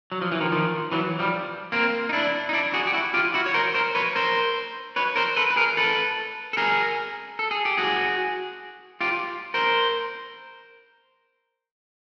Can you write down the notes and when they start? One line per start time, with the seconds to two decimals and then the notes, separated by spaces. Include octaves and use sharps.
0.12 F#3
0.21 F3
0.32 E3
0.41 D#3 F3
0.52 D#3 F3
0.92 E3 F#3
1.19 F3 G3
1.72 A#3 C4
2.09 D#4
2.13 D4 E4
2.49 D#4
2.53 D4 E4
2.74 F#4 G#4
2.87 G4
2.93 E4 F#4
3.14 F4 G4
3.34 E4 F#4
3.46 C#5
3.54 A#4 C5
3.74 A#4 C5
3.95 B4 C#5
4.15 A#4 C5
4.96 B4 C#5
5.16 A#4 C5
5.36 A4 B4
5.50 B4
5.56 G#4 A#4
5.77 A4 B4
6.53 A4
6.57 G#4 A#4
7.39 A4
7.51 G#4
7.65 G4
7.77 F#4 G#4
9.01 F4 G4
9.54 A#4 C5